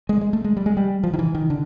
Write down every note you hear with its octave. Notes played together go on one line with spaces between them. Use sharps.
G#3
G#3
A3
G#3
G3
G#3
G3
F3
D#3
E3
D#3
D3